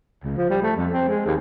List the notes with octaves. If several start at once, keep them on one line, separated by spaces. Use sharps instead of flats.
C#2
F3
G3
A3
F2
C4
G#3
D#2